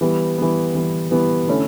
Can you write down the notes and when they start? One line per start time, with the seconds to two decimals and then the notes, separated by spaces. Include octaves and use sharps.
0.01 E3 G3 B3
0.38 E3 G3 B3
0.75 E3 G3 B3
1.11 E3 G3 B3
1.48 D3 A3 C#4 E4